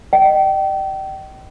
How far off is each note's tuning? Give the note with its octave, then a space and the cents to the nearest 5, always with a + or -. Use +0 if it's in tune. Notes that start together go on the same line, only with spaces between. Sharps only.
D#5 -25 G5 -30